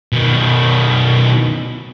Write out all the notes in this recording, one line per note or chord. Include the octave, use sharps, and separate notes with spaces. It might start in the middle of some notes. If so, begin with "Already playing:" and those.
B2 D#3